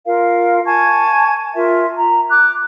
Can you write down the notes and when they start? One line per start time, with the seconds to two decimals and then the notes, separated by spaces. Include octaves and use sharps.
0.06 F4 A#4 F5
0.66 G#5 A5 C#6 G#6
1.55 F4 A#4 E5
1.97 A#5
2.29 D6 F#6